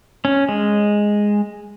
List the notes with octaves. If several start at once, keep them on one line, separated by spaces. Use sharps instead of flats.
C#4
G#3